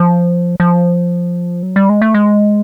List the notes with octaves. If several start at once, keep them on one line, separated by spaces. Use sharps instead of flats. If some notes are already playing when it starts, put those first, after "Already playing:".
Already playing: F3
F3
F#3
G3
G#3
A3
G#3